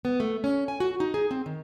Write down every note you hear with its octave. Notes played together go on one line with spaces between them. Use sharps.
B3
A3
C#4
G#5
F#4
D#4
G#4
C4
D#3